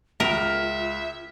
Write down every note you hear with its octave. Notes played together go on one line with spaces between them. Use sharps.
C#2 F4 A#4 E5 F6